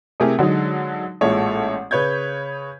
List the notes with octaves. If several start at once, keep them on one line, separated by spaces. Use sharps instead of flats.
C3 A3 E4 G4 G#4 A#4
D3 F#3 G#3 D#4
A1 A#2 G#3 E4 A4 C#5
C#3 B4 C#5 G6 G#6